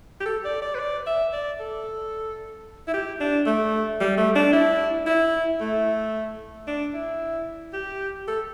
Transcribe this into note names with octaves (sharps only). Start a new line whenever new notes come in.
G4
A4
D5
D5
B4
D5
E5
D5
A4
E4
G4
D4
A3
G3
A3
D4
E4
E4
A3
D4
E4
G4
A4